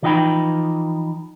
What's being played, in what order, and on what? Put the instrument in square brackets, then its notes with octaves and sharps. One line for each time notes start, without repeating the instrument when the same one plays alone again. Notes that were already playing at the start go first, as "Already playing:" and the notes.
[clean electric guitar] E3 F3 D#4 D#5 G5 B5